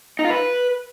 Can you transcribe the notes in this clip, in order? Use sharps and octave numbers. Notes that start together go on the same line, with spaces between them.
D#4
F4
B4